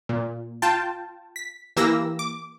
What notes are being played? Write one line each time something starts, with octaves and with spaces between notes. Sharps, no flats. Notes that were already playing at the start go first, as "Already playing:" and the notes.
A#2
F4 G5 A5
B6
E3 A#3 G4 E6 A#6
D6